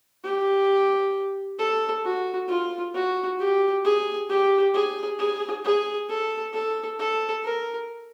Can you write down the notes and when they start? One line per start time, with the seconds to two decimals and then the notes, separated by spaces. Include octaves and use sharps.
0.24 G4
1.59 A4
2.05 F#4
2.49 F4
2.94 F#4
3.40 G4
3.85 G#4
4.29 G4
4.74 G#4
5.19 G#4
5.64 G#4
6.09 A4
6.54 A4
6.99 A4
7.44 A#4